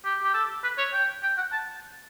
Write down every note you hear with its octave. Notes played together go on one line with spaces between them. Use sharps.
G4
G4
A4
B4
C#5
G5
G5
F#5
A5